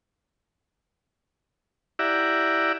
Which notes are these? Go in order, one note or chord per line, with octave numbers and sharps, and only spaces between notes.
E4 G4 D5 E5 F#5 A#5